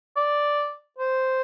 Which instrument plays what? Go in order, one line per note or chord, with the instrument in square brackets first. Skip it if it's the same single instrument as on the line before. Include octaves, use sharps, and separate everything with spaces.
[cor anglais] D5
C5